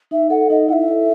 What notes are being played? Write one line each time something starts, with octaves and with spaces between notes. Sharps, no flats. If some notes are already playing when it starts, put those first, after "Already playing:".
D#4 E5
A4 F#5
D#4 D#5
E4 E5 F#5
A4